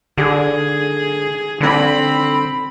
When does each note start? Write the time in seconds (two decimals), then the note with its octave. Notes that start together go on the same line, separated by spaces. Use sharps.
0.18 D3 G#4
1.61 D3 C4 B5